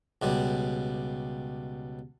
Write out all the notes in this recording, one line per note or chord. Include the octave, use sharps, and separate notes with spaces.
C#2 B2 G3